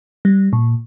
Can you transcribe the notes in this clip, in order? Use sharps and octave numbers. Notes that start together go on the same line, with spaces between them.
G3
A#2